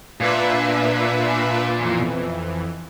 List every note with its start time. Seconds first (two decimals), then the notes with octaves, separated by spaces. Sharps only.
0.21 A#2 D4 B4 E5
1.77 F2 E3